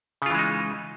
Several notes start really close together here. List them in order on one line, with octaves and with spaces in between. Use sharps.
C#3 F4 E3 G#3 D#4